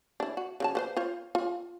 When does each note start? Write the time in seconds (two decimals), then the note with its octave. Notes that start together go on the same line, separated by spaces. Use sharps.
0.20 D4 E4
0.37 F#4
0.60 C#3 F#3 A5
0.75 F3 B4 C5
0.97 F4 C5 C#5
1.35 F4